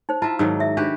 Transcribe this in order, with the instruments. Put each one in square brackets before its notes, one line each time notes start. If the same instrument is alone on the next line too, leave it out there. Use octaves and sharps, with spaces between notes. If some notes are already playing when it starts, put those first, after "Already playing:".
[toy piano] D#4 C5
[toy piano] E4 A5 [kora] F4 E5
[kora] G#2 D#3 F#3 [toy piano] E6
[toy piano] E5
[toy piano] D4 [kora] F#4 G4 B4